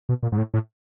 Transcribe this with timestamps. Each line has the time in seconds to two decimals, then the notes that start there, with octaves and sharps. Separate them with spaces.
0.09 B2
0.23 A#2
0.32 G#2
0.38 A2
0.54 A2